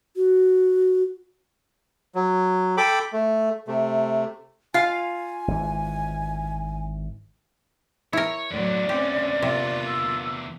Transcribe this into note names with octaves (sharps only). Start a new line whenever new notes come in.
F#4
F#3
A4 G5 B5 D6
A3
C3 A3
F4 F5 G#5
G#1 E3
E4 A#4 C#5
E2 A2 D3 F#3 D5
C4 C#4 G4
C3 A#3 F4
E6